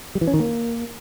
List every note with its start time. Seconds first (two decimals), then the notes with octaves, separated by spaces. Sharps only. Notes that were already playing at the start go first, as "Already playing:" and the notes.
0.15 G3
0.21 E3
0.27 C#4
0.34 D#3
0.40 A#3